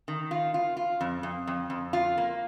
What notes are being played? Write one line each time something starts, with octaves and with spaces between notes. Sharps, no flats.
D#3
F4
F4
F4
F2
F2
F2
F2
F4
A#3